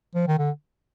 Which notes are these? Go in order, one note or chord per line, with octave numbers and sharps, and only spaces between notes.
F3
D#3
D3